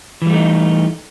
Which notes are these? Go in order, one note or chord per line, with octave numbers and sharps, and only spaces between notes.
E3 G3 A3 D#4